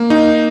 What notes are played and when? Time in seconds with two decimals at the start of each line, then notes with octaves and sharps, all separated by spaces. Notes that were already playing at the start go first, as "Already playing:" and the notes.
Already playing: A#3
0.10 D#4